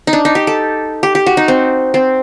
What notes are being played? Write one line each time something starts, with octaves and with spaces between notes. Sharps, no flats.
D#4
D4
D#4
G4
A4
G4
G4
F#4
D#4
C4
C4